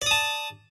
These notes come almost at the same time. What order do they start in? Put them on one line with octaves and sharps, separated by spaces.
D5 D#6 A5